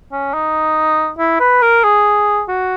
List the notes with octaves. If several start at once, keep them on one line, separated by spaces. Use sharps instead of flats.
C#4
D#4
E4
B4
A#4
G#4
F#4